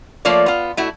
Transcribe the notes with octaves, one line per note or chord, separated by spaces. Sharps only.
F3 A3 A#3 F4 C#5 D5
B3 F4
A3 E4 F#4